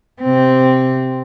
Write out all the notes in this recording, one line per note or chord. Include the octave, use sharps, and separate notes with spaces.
C3 C4